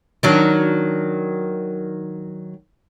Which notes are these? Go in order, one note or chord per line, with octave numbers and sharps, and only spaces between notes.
D#3 F#3 D4